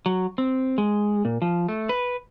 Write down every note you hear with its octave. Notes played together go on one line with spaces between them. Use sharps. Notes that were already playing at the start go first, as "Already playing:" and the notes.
F#3
C4
G#3
A#2
F3
A3
B4